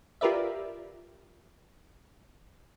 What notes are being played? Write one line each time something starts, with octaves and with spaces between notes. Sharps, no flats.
F4 G4 A#4 B4 D5 E5